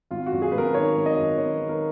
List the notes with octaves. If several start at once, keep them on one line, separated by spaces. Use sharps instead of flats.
G#1 F4
F#4
F#2
G#4
G#1 B4
A#4
D#3 C#5
G#1
D#5
F#2
G#1 C#5
B4
D#3
A#4